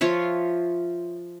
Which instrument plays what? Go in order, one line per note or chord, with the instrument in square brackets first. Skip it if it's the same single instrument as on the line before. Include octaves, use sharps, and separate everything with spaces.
[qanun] F3 F4 C#5 E5